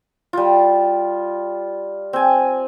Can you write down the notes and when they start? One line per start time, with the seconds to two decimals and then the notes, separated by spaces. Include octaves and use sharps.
0.33 G3 F4
2.13 C4 G#5